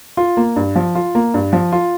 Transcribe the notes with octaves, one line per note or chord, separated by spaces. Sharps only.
F4
A#3
G2
F3
F4
A#3
G2
F3
F4